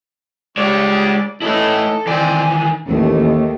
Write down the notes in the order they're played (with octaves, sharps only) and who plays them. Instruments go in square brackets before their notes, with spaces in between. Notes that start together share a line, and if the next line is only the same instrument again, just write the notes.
[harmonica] G3 D4 C#6 [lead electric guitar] G#3 C#5 [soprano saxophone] D5
[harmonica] E3 C#4 D#4 [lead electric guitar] A3 E4 [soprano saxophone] A4
[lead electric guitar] D#3 E3 [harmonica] C4 [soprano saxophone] D5 [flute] G#5
[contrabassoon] A1 [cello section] D#2 D#3 A3